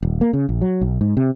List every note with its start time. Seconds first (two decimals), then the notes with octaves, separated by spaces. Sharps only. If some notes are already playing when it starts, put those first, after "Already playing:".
0.03 D#1
0.21 A#3
0.33 C#3
0.49 A#1
0.61 F#3
0.81 B1
1.01 G#2
1.17 C3